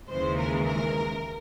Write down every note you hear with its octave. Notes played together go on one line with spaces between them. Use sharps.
D#2 C#3 E3 G#3 C5
A#4
A#4